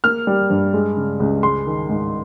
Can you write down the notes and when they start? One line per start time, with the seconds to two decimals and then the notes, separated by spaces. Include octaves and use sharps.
0.04 A#3 F6
0.27 G3
0.50 G2
0.74 G#3
0.97 C#3
1.20 C#2
1.43 G#3 C6
1.67 D#3
1.89 G#2